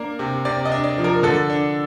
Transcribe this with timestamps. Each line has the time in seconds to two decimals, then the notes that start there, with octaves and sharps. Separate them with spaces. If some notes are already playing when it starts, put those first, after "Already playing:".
Already playing: A#3 D4 A#4
0.19 C3
0.45 C3 D5
0.65 D#5
0.72 D4
0.84 D5
0.98 F3
1.04 A#4
1.23 D3 A4
1.50 D4